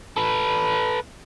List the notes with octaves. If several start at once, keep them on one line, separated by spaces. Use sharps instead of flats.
A4 B4